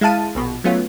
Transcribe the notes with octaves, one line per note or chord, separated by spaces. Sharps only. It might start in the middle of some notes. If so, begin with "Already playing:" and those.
G#3 E4 F5 A5 D#7
A#1 B2
F#3 A3 B3 C#4 F4